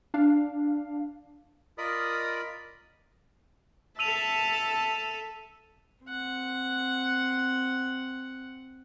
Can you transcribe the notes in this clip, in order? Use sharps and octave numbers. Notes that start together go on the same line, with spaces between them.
D4 F5
F4 A#4 D5 D#5 B5 D#6
A4 E5 A5 E6 D#7 F7
C4 F#5